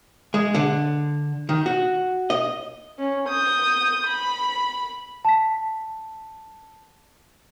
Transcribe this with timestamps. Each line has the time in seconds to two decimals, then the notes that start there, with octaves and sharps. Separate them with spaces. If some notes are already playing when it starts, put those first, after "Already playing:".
0.34 G#3
0.54 D3
1.49 D#3
1.66 F#4
2.30 D#5
2.99 C#4
3.29 D#6 G6
4.07 B5
5.25 A5 B6